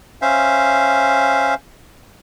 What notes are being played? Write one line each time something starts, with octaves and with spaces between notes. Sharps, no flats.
C#4 C5 E5 F5